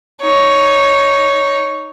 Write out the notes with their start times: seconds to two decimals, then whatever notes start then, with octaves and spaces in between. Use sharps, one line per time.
0.21 D#4 C#5